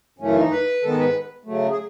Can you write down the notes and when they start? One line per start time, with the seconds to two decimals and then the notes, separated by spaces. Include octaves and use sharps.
0.19 F#2 C#3 E3 A3 C#4
0.36 D#4
0.51 B4
0.83 G#2 D#3 G#3 B3 A4
0.98 B4
1.45 C#3 F#3 A3
1.70 G#4